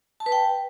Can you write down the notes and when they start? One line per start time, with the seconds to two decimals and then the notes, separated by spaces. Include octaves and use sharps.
0.20 A5
0.26 B4
0.32 G5